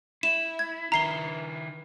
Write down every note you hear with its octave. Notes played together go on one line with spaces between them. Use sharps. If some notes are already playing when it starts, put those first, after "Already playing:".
E4 E7
G#6
D#3 E4 A#5 C7 G7